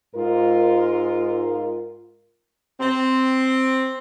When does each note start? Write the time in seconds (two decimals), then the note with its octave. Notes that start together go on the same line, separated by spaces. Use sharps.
0.16 G#2 F4 A#4
2.80 C4